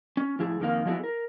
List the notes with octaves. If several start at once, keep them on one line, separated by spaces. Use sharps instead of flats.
C#4
A2 F3 E4 G#4
F2 D#3 A#3 F5
F3 F#3 G#3 A3 B3 E4
A#4